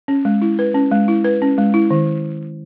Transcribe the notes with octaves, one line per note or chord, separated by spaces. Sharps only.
C#4
G#3
E4
B4
C#4
G#3
E4
B4
C#4
G#3
E4
D#3